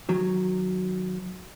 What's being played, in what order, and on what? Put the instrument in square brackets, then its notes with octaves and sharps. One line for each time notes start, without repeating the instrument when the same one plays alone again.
[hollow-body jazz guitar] D#3 F#3